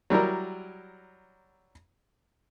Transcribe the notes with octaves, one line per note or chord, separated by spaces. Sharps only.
F#3 G3 E4 A#4